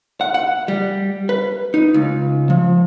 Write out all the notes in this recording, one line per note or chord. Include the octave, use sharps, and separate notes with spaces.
F#5
F#5
G3
B4
D#4
C#2
F3